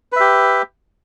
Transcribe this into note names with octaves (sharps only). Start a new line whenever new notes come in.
G4 B4 E5